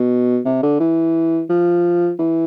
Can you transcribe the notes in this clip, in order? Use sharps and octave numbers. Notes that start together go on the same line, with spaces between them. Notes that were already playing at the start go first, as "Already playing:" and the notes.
Already playing: B2
C3
D3
E3
F3
E3